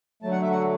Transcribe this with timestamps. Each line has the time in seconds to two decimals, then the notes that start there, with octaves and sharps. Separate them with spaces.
0.22 D3 F#3 A3 A5
0.31 F#5
0.42 E5
0.51 F#4 F#5